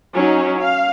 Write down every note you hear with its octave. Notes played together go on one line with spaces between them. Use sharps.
F#3 C#4 D#4
F5